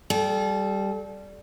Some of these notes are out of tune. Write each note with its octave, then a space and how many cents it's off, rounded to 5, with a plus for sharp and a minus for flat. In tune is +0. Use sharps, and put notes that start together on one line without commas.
G3 +0 A4 -30